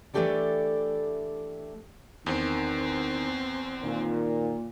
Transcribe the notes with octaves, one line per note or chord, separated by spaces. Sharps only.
E3 A3 D4 G4 A4 D5
E2 D#3 C4
A#2 D#3